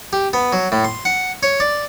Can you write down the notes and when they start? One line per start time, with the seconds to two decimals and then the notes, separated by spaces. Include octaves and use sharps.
0.13 G4
0.33 B3
0.53 F#3
0.72 A2
0.84 C6
1.05 F#5
1.43 C#5
1.60 D5